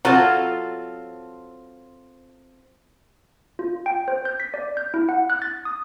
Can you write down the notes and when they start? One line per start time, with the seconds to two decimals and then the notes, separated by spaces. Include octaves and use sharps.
0.05 F#3 C4 F4 A4
3.59 F4
3.86 G5
4.08 C5
4.25 G6
4.40 B6
4.54 D5
4.77 G6
4.94 E4
5.09 F#5
5.30 F#6
5.42 A6
5.65 D#6